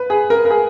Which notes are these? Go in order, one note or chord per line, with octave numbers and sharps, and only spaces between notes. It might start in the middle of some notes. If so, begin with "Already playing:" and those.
Already playing: B4
G#4
A#4
A#4
G#4